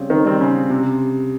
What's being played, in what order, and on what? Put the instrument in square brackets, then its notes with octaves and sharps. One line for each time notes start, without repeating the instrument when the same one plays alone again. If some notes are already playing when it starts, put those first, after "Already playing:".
Already playing: [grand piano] C#3 G3 C4
[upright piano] D#3
[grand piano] G3 C4
[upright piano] C#3
[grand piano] C3